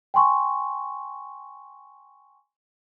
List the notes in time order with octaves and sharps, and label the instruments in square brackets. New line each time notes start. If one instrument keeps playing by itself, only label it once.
[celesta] G5 G#5 C6 C#6